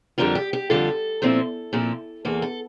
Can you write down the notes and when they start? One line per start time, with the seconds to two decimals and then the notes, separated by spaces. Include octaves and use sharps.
0.18 F2 D3 G3 D4 F4 A#4
0.35 G4
0.53 G4
0.70 F2 D3 G3 D4 F4 A4
1.22 A#2 F3 C4 E4
1.73 A#2 F3 C4 E4
2.25 E2 E3 A#3 A4
2.42 A4